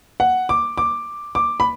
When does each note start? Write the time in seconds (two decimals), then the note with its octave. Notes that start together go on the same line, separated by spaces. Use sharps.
0.20 F#5
0.49 D6
0.78 D6
1.35 D6
1.60 B5